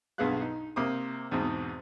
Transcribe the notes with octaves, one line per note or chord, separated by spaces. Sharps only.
B1 G2 B3 G#4 F5 F#6
D#4
C3 A#3 C5 D6 D#6
E2 G#2 B2 C4